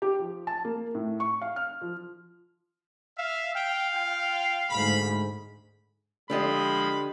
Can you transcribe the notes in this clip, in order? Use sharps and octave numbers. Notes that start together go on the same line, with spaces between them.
G4
F3
A5
A#3
A2
C#6
F5
F6
F3
E5 F5
F5 G5
F4 G5
D2 G#2 B5
D3 F3 G#3 F4 G4 D#5 B5